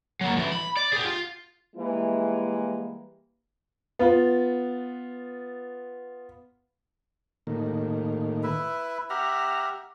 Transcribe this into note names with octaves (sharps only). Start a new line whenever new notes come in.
F#3 A#3
A2 E3
B5
D5
G4 G#4
F4
E3 G3 G#3 A#3 E4
B3 F4
A2 D#3 A#3
E4 B4 E5
G4 E5 F#5 A#5 F6